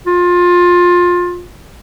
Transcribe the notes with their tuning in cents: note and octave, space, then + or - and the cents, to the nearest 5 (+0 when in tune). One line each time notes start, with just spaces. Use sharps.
F4 +20